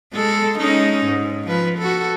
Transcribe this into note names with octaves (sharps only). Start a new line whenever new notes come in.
G#3 A4
G#3 C#4 D#4
G#2
F3 B4
F#4 A4